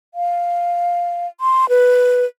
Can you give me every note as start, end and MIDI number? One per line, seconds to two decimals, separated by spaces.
0.14 1.27 77
1.41 1.68 84
1.69 2.25 71